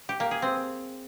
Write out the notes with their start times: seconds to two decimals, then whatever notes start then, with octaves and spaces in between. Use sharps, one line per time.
0.09 G4
0.20 A#3
0.31 G#4
0.42 C4